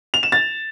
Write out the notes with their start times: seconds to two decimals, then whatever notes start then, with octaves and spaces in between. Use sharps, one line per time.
0.14 F7
0.23 E7
0.32 A6